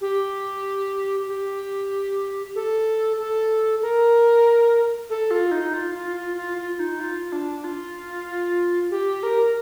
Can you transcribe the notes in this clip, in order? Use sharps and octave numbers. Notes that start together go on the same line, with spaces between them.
G4
G4
A4
A4
A#4
A4
F4
D#4
F4
F4
F4
F4
F4
D#4
F4
D4
F4
G4
A#4